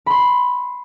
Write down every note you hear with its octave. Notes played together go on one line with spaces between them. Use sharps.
B5 C6